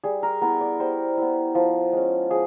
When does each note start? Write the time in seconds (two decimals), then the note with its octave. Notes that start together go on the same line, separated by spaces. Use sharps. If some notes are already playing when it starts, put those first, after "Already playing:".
0.04 G3 G#4
0.23 A#4
0.42 B3 E4 A#4
0.61 D5
0.79 G3 C5
1.17 B3 E4
1.55 F3
1.93 G#3 C#4
2.30 F3 G#4